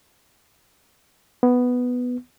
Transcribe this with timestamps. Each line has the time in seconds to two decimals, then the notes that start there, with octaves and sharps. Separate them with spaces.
1.43 B3